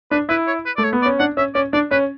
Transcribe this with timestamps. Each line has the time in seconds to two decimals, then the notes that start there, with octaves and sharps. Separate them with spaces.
0.11 D4 B4
0.29 E4 B4
0.47 C#5
0.66 B4
0.77 A3 D5
0.84 C#5
0.93 B3
1.02 D5
1.06 C#4
1.19 D4 F#5
1.37 C#4 E5
1.55 C#4 D5
1.73 D4 D5
1.91 C#4 B4